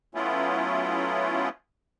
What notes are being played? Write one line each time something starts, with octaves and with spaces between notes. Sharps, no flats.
F#3 A3 B3 C#4 E4 F4